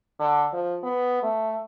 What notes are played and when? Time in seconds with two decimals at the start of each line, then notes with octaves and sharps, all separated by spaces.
0.20 D3
0.53 F3
0.83 B3
1.23 A3